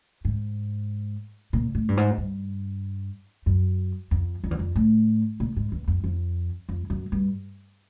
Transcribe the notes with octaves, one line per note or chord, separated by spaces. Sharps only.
G#2
A#2
A2
G2
G#2
G2
F#2
F2
F2
E2
F2
A2
A#2
G#2
E2
F2
F2
F2
F#2
G2